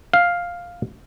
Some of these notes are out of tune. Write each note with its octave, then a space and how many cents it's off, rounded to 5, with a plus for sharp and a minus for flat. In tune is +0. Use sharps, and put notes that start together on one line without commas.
F5 +5